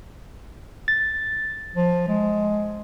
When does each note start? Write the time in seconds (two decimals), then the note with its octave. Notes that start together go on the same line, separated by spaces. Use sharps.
0.88 A6
1.75 F3
2.08 G#3